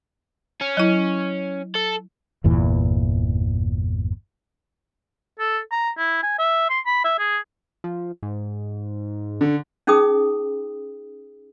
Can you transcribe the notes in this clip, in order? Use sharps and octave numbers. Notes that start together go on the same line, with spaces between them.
C#4
F#3 E4
A4
G1 E2 A#2 E3
A4
A#5
E4
G#5
E5
C6
B5
E5
G#4
F3
G#2
D3
C#4 D#4 G#4 G5 D#6